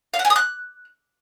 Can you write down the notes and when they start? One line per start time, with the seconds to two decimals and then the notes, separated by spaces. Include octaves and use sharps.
0.14 F5
0.19 F#5
0.25 G#5
0.30 D#6
0.36 F#6